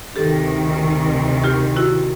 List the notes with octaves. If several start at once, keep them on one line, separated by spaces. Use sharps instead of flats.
D2 C3 D#3 G4 A4
F4 G4
E4 F#4